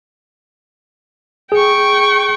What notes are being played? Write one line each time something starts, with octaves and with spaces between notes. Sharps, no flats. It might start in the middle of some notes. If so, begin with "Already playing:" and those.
G#4 G5 C#6